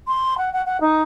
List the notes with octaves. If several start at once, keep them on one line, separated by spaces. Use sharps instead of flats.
C6
F#5
F#5
F#5
D#4